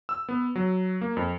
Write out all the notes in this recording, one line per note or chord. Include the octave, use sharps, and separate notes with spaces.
E6
B3
F#3
A#3
F2